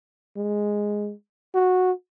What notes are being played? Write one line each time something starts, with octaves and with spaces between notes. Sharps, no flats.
G#3
F#4